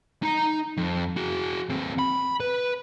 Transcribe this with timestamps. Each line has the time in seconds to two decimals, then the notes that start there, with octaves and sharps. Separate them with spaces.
0.22 D#4 A#5
0.77 F2
1.17 F#4 G#4
1.69 D#2 C4
1.99 B5
2.40 B4